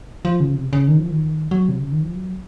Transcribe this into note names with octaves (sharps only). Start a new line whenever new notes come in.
F3
C#3
C3
C#3
D#3
F3
D#3
F#3
C3
C#3
D#3
F3
F#3